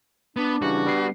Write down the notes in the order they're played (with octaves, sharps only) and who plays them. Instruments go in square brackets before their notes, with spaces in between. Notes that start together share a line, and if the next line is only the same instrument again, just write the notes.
[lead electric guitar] B3 [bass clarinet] D4
[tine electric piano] C#3 E3 G3 [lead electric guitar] F#4
[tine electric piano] G3 B3 C7